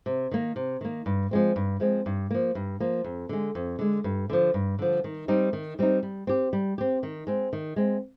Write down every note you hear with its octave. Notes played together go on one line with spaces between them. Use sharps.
C3
D#3 A#3
C3
D#3 A#3
G2
F3 G#3 C4
G2
F3 G#3 C4
G2
F3 A#3
G2
F3 A#3
F2
D3 G#3
F2
D3 G#3
G2
D3 F3
G2
D3 F3
D#3
G3 C4 D#4
D#3
G3 C4 D#4
G3
C4 G4
G3
C4 G4
D#3
G#3 C4
D#3
G#3 C4